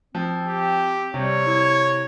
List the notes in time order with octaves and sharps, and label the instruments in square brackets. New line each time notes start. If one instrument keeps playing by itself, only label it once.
[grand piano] F3 [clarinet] C4
[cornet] G4
[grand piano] C3 [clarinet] G3 [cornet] C#5
[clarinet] E4